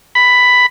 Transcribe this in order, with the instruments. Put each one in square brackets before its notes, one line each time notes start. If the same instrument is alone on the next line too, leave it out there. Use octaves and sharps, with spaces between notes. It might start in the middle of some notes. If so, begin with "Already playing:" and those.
[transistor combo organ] B5